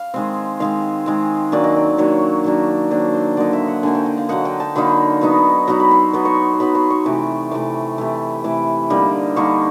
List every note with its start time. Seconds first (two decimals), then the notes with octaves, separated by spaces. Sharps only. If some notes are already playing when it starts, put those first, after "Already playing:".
Already playing: F5
0.14 D#3 G#3 C4
0.60 D#3 G#3 C4 F5
1.06 D#3 G#3 C4
1.52 D#3 F#3 A#3 D4 D5
1.64 D#5
1.76 D5
1.98 D#3 F#3 A#3 D4 C#5
2.44 D#3 F#3 A#3 D4
2.90 D#3 F#3 A#3 D4 C5
3.14 C5
3.37 D3 F#3 A#3 D#4 D5
3.53 E5
3.68 F#5
3.83 D3 F#3 A#3 D#4 G#5
3.95 G5
4.06 F#5
4.18 F5
4.29 D3 F#3 A#3 D#4 F#5
4.45 G5
4.60 A5
4.75 D3 F#3 A#3 D#4 B5
5.21 F#3 B3 D#4
5.67 F#3 B3 D#4 A#5
5.80 B5
5.91 C6
6.13 F#3 B3 D#4 C6
6.25 C#6
6.36 C6
6.53 C6
6.60 F#3 B3 D#4 B5
6.75 C6
6.90 C#6
7.05 C3 E3 A3 D6
7.51 C3 E3 A3 D6
7.98 C3 E3 A3
8.44 C3 E3 A3 D6
8.90 D3 G3 A#3 D#4
9.36 D3 G3 A#3 D#4 C#6